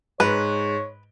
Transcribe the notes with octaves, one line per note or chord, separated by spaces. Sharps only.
G#2 B4 C#5